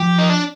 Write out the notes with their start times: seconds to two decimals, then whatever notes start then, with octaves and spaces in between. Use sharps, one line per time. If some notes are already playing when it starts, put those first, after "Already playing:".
Already playing: F3 G4
0.18 D#4
0.29 D4